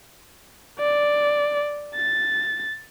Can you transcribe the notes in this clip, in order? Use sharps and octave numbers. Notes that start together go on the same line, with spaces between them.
D5
A6